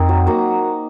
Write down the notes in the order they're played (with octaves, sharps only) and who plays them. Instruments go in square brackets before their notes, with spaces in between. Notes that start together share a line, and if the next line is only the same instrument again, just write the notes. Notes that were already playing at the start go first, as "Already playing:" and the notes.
Already playing: [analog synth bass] F2 [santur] C4 D#4 A#4
[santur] F#3
A#3 D#4 F#4